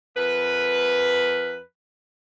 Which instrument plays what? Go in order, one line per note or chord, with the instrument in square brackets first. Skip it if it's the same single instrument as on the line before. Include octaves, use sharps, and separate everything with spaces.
[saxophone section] F2 A#4 B4